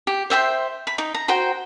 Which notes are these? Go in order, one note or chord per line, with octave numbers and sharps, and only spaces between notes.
G4
C5 E5 G5 C6
B5
D#4
A#5
F#4 C5 G5 A#5